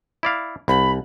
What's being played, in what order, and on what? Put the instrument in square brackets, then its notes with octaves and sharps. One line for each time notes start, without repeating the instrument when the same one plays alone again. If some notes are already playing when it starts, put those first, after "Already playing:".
[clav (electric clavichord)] E4 D5 F5
[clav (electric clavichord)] C2 [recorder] B5